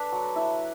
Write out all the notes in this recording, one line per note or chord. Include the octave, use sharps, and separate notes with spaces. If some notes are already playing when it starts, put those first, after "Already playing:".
Already playing: D4 A4 B4
F#3
E4